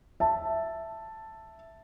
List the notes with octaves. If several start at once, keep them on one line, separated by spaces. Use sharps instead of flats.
E5 A5